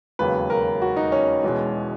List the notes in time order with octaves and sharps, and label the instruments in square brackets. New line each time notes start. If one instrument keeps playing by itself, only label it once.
[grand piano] E1 D#2 C#3 F#3 B4
A#4
F#4
D#4
C#4
E1 E2 B2 G#3